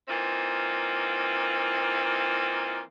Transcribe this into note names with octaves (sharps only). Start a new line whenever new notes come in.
E3 A#3 C4 D#4 F4